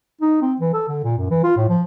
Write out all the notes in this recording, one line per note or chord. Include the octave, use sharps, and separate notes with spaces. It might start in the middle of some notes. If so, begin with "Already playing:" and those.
D#4
C4
E3
A4
D3
A#2
F#2
E3
F4
A2
F3